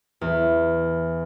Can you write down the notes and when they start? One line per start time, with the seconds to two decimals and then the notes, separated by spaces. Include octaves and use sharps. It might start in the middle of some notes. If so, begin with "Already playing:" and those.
0.21 E2